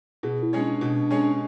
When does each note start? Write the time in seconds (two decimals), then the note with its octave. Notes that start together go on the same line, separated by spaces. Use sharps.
0.23 B2 G#4
0.43 E4
0.53 G#3 C#4 G#4 C#5
0.62 D4
0.81 B2
1.11 G#3 C#4 G#4 C#5